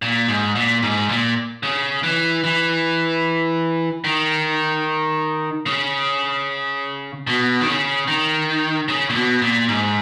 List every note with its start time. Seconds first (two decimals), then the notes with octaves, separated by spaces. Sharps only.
0.02 A#2
0.28 G#2
0.55 A#2
0.83 G#2
1.09 A#2
1.63 C#3
2.03 E3
2.44 E3
4.04 D#3
5.66 C#3
7.27 B2
7.61 D#3
7.67 C#3
8.08 D#3
8.88 C#3
9.09 A#2
9.15 B2
9.42 A#2
9.68 G#2